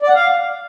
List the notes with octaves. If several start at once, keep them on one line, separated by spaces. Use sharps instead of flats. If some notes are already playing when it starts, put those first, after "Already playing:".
D5
F#5
F5